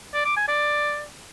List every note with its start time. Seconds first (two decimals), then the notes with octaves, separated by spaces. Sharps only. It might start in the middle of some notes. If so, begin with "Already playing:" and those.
0.14 D5
0.25 D6
0.37 G#5
0.48 D5